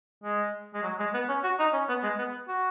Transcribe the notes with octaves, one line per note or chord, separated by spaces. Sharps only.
G#3
G#3
F#3
G#3
B3
C#4
F#4
D#4
C#4
B3
G#3
B3
F#4